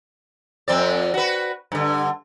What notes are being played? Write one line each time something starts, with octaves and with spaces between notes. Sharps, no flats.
F2 C4 D5
F#4 B4
G2 D3